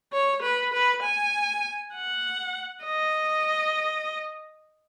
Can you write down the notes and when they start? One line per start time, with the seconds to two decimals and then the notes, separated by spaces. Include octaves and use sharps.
0.12 C#5
0.42 B4
0.73 B4
1.03 G#5
1.94 F#5
2.84 D#5